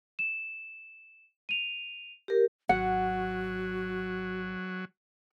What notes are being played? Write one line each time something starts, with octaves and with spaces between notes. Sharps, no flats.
E7
D#7 F7
G4 A#4
G#1 F#3 F#4 F#5